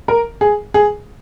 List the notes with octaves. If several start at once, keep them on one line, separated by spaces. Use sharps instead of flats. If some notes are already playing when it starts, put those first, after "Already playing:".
A#4
G#4
G#4